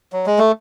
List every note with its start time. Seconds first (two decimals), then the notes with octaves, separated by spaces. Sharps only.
0.12 F#3
0.26 G#3
0.38 A3